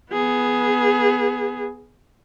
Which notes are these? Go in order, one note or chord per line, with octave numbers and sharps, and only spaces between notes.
B3 G#4